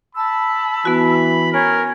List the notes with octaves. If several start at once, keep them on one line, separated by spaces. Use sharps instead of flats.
A5 B5 E6
E3 B3 F#4
C#4 A#4